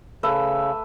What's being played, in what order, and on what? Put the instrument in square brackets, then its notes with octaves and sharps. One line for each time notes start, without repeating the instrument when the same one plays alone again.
[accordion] C#3 [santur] A3 B4 E5